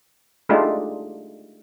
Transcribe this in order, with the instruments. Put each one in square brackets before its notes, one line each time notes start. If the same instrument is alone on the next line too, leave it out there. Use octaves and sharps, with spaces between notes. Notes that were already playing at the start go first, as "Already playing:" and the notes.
[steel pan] G#3 A3 D4 D#4 F4 G4